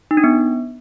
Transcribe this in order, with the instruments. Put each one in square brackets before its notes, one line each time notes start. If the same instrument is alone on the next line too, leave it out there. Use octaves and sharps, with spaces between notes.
[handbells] D#4
D4
B3